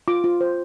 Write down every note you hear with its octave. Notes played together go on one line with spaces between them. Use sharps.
F4 D6
F4
C5